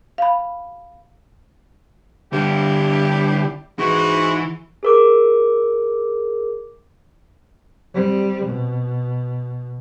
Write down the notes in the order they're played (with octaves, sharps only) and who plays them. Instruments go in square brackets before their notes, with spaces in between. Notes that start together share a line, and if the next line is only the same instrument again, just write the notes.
[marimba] F5 B5
[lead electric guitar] D3 G3 [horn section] D4 E4 G4
[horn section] G#2 F#4 [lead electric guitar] E3
[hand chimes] G#4 A#4 D6
[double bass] G3 C4
B2